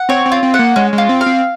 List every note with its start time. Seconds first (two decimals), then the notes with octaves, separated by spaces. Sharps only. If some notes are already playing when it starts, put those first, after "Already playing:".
Already playing: F#5
0.09 C4 C#5
0.26 C4
0.32 F4
0.43 C4
0.54 F#5
0.59 A#3
0.76 G#3 C#4
0.93 G#3
0.98 F4
1.09 C4
1.21 F5
1.26 C4